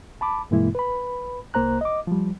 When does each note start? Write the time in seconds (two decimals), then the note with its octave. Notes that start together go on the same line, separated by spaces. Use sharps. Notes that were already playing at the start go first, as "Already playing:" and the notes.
0.21 A5 B5 D6
0.51 G2 B2 E3 G#3 A#3 E4
0.75 B4 B5
1.54 C2 A#3 C5 A#5 F#6
1.81 D#5 D6
2.07 F3 G3